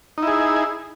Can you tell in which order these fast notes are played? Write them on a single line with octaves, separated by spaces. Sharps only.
D#4 E4 G#4